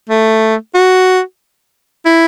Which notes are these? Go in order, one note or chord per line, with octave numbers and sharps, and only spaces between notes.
A3
F#4
E4